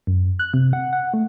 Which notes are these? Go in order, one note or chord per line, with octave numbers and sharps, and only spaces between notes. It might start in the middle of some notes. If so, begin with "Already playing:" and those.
F#2
F#6
C3
F#5
F#5
A3